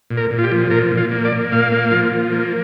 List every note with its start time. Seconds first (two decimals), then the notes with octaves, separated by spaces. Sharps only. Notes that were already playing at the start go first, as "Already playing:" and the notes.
0.10 A#2
0.17 A#4
0.31 A#2
0.38 F4
0.44 G4
0.52 F3
0.71 A#2 A#4
0.92 A#2
0.97 F4
1.11 A#3
1.25 D5
1.32 A#3
1.52 A#2 F5
1.72 A#3
1.91 F3
2.12 F3
2.32 A#3